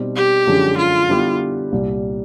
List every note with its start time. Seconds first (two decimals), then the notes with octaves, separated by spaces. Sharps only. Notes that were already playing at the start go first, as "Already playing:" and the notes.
Already playing: B2 G3 C4 D#4
0.16 G4
0.47 F#2 D3 F3 G#3 C#4
0.78 F4
1.09 D3 G3 B3 E4 G4
1.72 C2 A#2 G3